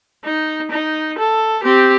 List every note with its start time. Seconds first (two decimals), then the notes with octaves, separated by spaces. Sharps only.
0.25 D#4
0.72 D#4
1.19 A4
1.63 C4 G4